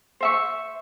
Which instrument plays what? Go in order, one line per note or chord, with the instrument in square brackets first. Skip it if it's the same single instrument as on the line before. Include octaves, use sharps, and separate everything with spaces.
[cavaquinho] C5 E5 C#6